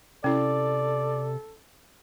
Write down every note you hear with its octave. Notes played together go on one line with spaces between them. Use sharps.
C3 C#4 E4 A4 D5